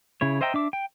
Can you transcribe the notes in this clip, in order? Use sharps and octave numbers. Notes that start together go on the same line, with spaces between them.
C#3 E4 C#5
C5 D#5 E5 G5 A#5
D4 E5 D6
G5